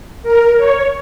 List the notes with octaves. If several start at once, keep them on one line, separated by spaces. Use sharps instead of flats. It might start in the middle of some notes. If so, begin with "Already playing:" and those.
A#4
C#5